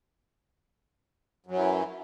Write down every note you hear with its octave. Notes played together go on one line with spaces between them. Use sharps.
F#2 E3 F#3